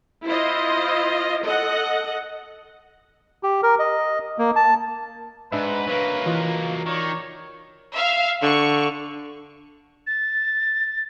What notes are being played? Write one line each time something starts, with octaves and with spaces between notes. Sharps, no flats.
E4 F4 C5 D#5
A4 D#5 F#5
G4
A#4
D#5
A#3
A5
G#2 D4 B4 D#5 E5
F#3 A#3
E3 F4 D#5
D#3 C#5 D5 C#6
E5 F5
D3 C#6
A6